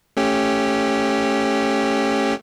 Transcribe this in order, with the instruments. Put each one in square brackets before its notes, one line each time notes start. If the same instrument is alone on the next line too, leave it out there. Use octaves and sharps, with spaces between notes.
[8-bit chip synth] A3 C#4 G4